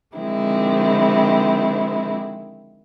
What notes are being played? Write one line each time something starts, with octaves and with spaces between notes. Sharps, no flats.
D3 D#3 F3 G#3 C4 E4